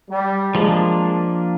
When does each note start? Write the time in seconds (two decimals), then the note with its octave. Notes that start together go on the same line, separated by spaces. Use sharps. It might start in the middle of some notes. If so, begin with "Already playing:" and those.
0.09 G3
0.54 F3 G#3 A#3 D4